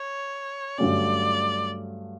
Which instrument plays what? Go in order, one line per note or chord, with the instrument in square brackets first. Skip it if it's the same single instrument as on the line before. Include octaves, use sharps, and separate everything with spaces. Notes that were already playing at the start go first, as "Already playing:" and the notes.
Already playing: [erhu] C#5
[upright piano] G2 D3 F#3 A3 C#4 [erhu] D5